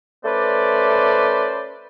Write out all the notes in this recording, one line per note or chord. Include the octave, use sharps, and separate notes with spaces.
A3 C#4 B4 C5 D5